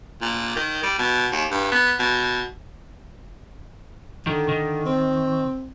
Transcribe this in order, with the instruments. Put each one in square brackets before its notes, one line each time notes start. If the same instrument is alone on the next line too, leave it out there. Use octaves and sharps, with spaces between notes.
[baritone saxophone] A#2
D#3
G3
B2
D#2
G2
B3
B2
[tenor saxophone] D3 [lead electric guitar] D#3
[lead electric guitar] D#3
[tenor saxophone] C4